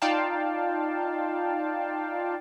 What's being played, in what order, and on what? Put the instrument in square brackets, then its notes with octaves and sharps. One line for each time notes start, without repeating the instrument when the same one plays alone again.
[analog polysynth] D#4 F4 D5 F5 G5 A5